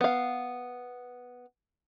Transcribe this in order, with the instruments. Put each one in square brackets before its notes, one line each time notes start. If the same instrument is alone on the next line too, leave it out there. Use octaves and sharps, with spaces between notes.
[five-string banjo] B3 F5